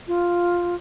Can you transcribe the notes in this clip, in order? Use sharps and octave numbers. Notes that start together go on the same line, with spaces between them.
F4